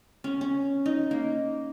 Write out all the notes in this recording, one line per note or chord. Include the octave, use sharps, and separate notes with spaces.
C#4
C#4
D#4
A#3